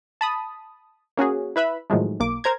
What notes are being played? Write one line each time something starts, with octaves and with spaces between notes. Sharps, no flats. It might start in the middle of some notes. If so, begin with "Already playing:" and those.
A5 B5 D#6
A#3 C#4 F#4 G#4
E4 B4 E5 B5
A2 D#3 F3 F#3 G#3 A3
B1 A#3 D6
A#4 C5 A#5 G#6